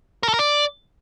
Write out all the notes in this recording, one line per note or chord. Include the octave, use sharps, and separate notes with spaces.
A#4
A4
A#4
D5